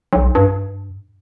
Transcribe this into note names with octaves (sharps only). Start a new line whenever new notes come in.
B1
G2